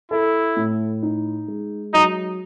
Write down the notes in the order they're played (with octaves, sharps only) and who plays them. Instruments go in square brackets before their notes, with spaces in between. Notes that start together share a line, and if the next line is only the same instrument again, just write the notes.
[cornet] E4 [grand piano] A4
[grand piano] A2
D#4
G#3
[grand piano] F#3 [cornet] D#4